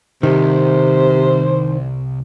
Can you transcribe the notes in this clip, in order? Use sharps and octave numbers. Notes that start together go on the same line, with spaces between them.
C2 C3 D#3 C5